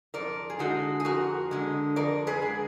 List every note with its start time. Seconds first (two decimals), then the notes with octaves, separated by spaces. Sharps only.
0.14 F2 A#4 D5
0.50 G#4
0.59 D3 G#3 D#4 F#4
1.00 G#4
1.05 F2 F#4 A#4
1.51 D3 G#3
1.96 F2 A#4 D5
2.27 G#4 B4
2.42 D3 G#3